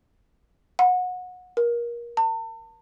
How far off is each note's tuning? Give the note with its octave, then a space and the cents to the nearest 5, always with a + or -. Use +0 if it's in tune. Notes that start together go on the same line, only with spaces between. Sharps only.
F#5 -25
A#4 +25
A5 +40